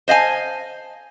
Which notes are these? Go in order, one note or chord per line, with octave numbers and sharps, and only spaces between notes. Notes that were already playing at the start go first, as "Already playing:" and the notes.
C5 D#5 F5 G#5